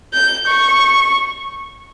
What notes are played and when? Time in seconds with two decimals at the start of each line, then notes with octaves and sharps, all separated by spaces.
0.14 G6
0.47 C#6